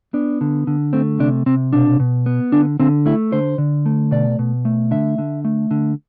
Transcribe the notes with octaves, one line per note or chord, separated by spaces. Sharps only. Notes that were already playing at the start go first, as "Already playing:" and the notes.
B3 D4
D3
D3
A3 C4
C3 D4
C3 C4
B2 D4
B2
B3
D3 D4
D3 C4
A3 E4
D3 C5
D3
A3
B2 D5
B2
A3
D3 E5
D3
A3
D3